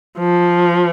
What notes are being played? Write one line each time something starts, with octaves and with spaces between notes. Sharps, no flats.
F3